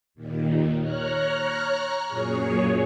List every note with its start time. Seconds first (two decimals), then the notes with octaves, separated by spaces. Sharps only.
0.15 D#2 A#2 D#3
0.81 C#5 A#5 F6 F#6
2.07 F#2 A#2 G#4 C#5